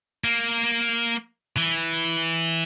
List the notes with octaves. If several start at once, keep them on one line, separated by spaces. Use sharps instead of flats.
A#3
E3